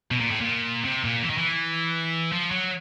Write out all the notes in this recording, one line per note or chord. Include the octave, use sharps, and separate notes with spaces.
B2
A#2
A2
A#2
C3
A#2
E3
D#3
E3
F3
F#3